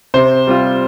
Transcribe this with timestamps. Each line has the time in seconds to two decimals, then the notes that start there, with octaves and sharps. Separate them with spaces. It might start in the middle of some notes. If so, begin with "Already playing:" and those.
0.14 C3 C5
0.47 G3 C4 F4